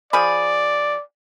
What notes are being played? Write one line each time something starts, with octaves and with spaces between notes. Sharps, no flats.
F3 G#4 D5 B5